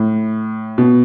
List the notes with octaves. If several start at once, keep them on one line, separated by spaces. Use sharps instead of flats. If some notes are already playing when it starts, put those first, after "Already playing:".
Already playing: A2
B2